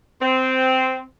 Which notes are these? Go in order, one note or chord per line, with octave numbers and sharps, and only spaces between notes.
C4